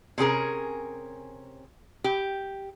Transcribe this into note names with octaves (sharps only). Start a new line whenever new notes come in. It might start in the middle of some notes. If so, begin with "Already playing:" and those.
C3 C#4 G#4 A#4
G4